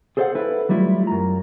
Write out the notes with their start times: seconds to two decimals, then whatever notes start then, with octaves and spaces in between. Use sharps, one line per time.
0.17 G#4 A4 C5 C#5 F5 F#5
0.35 E4 A4 B4
0.69 F#3 G3 A3 E4 F4
1.07 F#2 A#5